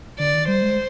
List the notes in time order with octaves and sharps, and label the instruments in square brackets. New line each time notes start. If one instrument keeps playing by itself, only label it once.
[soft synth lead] D3 [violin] D5
[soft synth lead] D#3
[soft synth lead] G3 [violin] C5
[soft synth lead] G#3